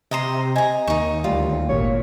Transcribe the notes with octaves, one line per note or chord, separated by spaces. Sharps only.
C3 D#5 A#5 C6
D#5 G#5 A#5
D#2 D#4 C#6
D2 G3 F4
G#1 A#2 C#5